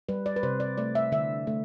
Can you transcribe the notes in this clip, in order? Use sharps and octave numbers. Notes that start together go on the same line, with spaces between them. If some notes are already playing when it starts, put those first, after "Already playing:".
G3 B4
D5
B4
C3 C5
D5
A3 D5
E5
D3 E5
A3